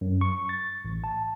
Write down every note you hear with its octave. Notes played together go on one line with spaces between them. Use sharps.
F#2
C#6
A6
A1
A5